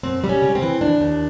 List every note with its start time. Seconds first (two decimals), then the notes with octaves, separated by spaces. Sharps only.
0.03 F#2 C4
0.24 G3
0.29 C#4
0.42 C#3
0.55 C4
0.62 E3
0.81 D#2 D4
1.00 D#2